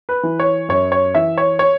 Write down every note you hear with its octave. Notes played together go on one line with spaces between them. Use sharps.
B4
E3
C#5
F#2 C#5
C#5
E3 E5
C#5
C#5